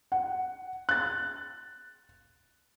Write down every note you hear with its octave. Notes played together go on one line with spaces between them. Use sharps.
F#5
F#6 A6